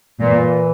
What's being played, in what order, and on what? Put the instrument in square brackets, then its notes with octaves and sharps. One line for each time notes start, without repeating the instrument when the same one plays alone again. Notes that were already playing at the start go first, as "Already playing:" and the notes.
[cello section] A#2 [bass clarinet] E3